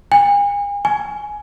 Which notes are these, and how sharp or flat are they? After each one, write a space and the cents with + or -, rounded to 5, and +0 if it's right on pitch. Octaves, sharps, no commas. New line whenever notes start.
G#5 -40
G#5 +10